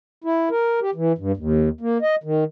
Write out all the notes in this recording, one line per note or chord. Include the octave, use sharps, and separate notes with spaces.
E4
A#4
G4
E3
G2
D#2
A#3
D#5
D#3